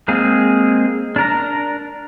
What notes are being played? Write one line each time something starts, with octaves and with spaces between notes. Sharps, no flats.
G#3 A#3 C4 G#4
D4 A#4 A#5